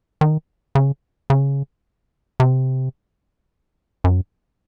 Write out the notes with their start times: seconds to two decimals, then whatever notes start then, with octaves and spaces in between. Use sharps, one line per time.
0.21 D#3
0.75 C#3
1.30 C#3
2.40 C3
4.04 F#2